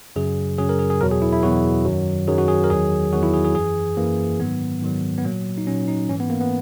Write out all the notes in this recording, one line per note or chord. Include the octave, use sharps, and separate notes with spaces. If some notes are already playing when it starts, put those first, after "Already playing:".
F#2 C#3 F#3 G#4
F#2 C#3 F#3 G#4
A#4
G#4
G#4
E2 B2 F#3 A#4
G#4
E4
E4
E2 B2 F#3 F#4
F#2 D#3 F#3
F#2 D#3 F#3 G#4
F#4
G#4
A#4
E2 D#3 F#3 G#4
E2 D#3 F#3 F#4
E4
G#4
G#4
F#2 E3 G#4
F#2 E3 A#3
G#2 D#3 F#3 B3
G#2 D#3 F#3
B3
A#2 F#3 A#3
D#4
A#2 F#3 C#4
D#4
G#2 E3 C#4
B3
A#3
B3